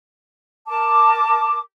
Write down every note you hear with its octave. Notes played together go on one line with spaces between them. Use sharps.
A#4 A5 D6